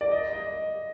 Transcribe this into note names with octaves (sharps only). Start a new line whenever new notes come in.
D5
D#5
D#5